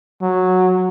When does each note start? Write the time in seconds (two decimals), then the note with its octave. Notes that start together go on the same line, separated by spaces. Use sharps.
0.22 F#3